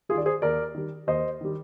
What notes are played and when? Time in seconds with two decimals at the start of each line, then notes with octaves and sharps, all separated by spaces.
0.09 G3 F4 G#4
0.14 D#3 D5
0.26 G#4 C5
0.42 D#2 A#4 D5
0.74 D#3 G3
1.07 D#2 C5 D#5
1.41 D#3 G3